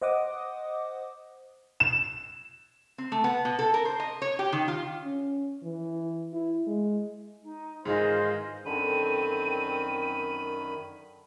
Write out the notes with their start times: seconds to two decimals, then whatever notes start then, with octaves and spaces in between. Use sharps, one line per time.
0.02 C5 D#5 F#5 D6 D#6
1.80 E7
2.98 C4
3.12 A3
3.24 B3
3.45 B2
3.59 A4
3.74 A#4
3.85 C5
4.00 D#5
4.22 C#5
4.39 G4
4.52 D#3
4.68 F4
5.04 C#4
5.63 E3
6.33 E4
6.67 G#3
7.42 D#4
7.85 G#2 D#3 E3 F4 G#4 C5 D#5
8.66 F#2 D3 D#3 C4 B5 D#7